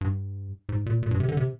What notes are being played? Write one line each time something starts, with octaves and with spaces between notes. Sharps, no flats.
G2
G#2
A#2
A#2
G2
C3
D3
C3